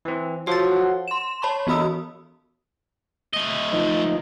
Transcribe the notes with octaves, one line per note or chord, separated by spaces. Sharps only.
E3 C4
F3 F#4 A4 C#5 C6 A6
C6 E7
C#5 A5 B5 C#6
E3 B3 F#4 B5 D#6 E6
A3 D#5
F3 D#4